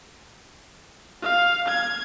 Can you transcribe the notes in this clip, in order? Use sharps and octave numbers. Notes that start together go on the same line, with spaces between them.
F5
G#6